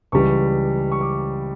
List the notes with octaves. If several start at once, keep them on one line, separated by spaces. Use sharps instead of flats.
C#2 C#3 E3 G3 C#6
C#6
D6